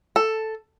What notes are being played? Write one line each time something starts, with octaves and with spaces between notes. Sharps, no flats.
A4